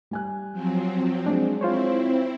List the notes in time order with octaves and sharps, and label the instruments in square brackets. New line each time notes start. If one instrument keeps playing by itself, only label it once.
[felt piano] G3 G#5 F#6
[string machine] F3 F#3 C4
[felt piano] G#3 [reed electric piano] D4
[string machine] C4 E4 [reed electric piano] F4 C5 C#5